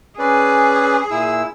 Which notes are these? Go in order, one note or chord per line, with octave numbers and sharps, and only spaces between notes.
C#4 G#4 B4 D5
A#2 E4 E6